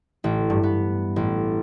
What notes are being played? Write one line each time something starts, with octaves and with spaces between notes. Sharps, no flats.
A1
G2
B3
A1